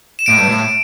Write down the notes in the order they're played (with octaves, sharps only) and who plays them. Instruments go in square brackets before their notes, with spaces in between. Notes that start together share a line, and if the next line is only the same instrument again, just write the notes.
[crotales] E7
[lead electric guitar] A2 [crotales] D7
[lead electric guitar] G2
A2